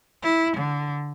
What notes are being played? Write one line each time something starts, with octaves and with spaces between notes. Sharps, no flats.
E4
D3